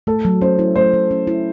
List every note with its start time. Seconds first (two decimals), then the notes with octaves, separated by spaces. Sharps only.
0.07 A3 A4
0.25 F#3
0.41 C#4 C5
0.59 E4
0.76 A3 C5
0.93 F#3
1.11 C#4
1.27 E4